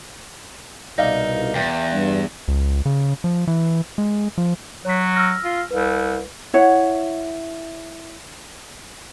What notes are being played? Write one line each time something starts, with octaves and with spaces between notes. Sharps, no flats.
C2 B2 D#4 D5 E5 F5
E2 G5
G2
C#2
C#3
F3
E3
G#3
F3
F#3 C#5 B6
E6 F6 A#6
F4
C2 B4
E4 C#5 F#5